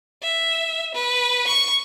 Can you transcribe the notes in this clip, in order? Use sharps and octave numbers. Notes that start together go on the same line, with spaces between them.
E5
B4
C#6